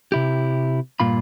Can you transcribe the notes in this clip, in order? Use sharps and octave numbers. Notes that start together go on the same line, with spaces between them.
C3 E4 G4
G2 A#2 F4 B5